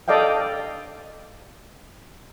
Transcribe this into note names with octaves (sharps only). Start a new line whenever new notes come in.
A4 D5 D#5 F5 G5